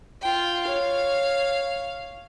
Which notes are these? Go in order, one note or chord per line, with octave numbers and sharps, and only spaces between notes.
F4 G5
C#5 F5